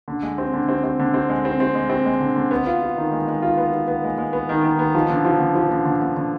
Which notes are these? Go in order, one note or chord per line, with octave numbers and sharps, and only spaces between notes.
D3
G#3
C4
D3
C4
C4
D3
C4
G#3
C4
C4
G#3
C4
G#3
D3
D3
B3
F4
F4
D#3
G#3
G#3
F4
B3
F4
B3
G#3
G#3
B3
D#3
D#3
B3
F3
D3
F3
D3
F3
D3
D3
D3
D3